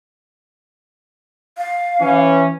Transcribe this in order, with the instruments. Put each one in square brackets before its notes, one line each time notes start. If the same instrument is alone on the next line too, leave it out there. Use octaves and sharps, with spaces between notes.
[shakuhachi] F5
[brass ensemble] E3 C#4